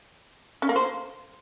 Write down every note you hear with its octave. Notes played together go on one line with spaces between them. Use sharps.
C#4
A#3
C5